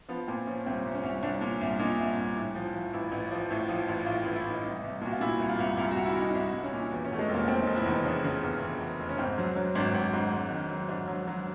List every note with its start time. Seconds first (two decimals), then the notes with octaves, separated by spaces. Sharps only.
0.08 F3 B3
0.28 A#2 C4
0.47 F3 C#4
0.66 C2 C4
0.85 C2
0.95 C#4
1.03 C2
1.23 C2 D4
1.41 A#2
1.61 C2
1.79 A#2 D#4
1.99 C2
2.18 C2
2.37 A2
2.55 F3
2.74 F3
2.93 A1 E4
3.12 A1
3.31 F3
3.51 A2
3.69 F3
3.89 A1
4.06 A2 F4
4.22 F4
4.25 A1
4.35 E4
4.45 A1 D#4
4.63 C2 D#4
4.83 C2
5.01 A#2 F#4
5.12 F4
5.20 A#2 E4
5.39 C2
5.49 F4
5.59 C2
5.77 C2 F4
5.91 F#4
5.96 C2
6.05 E4
6.16 C2 D#4
6.30 D#4
6.34 C2 D4
6.53 C2
6.63 C#4
6.73 A#2
6.92 E2
7.05 C#4
7.10 E2 A3
7.19 G#3
7.29 F1
7.34 A#3
7.48 F1 C4
7.62 D#4
7.67 F1
7.76 E4
7.86 E2 D#4
8.05 C#3 D4
8.24 C#3
8.43 E2
8.62 E2
8.80 E2
8.99 F1
9.09 C#4
9.18 G#2 C4
9.38 F#3
9.56 F#3
9.75 G#1 D4
9.94 G#1
10.13 G#2
10.32 G#1
10.50 D#3
10.70 F#3
10.89 G#2 D4
11.08 F#3
11.27 F#3